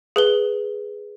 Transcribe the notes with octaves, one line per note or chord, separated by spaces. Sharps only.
G#4 B4 G7